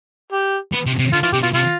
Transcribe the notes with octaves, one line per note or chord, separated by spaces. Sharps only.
G4
B3
C3
C3
D3 F4
E3 F4
C3 G4
B2 F4
C3 F4